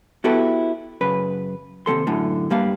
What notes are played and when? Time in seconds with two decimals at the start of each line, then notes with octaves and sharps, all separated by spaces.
0.24 B3 E4 F#4 G4 A4 B4
1.01 F#2 C#3 B4
1.86 D#2 C3 F#3 A4 C6
2.07 F#2 A2 D3
2.50 G2 G3 A#3 F5